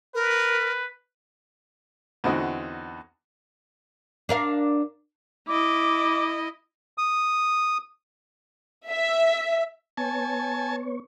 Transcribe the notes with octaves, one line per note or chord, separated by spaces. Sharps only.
A#4 B4
E2 D3 C4 D#4 F#4 D#5
D4 A#4 F5
E4 D#5 D6
D#6
E5
B3 C#5 G#5 A5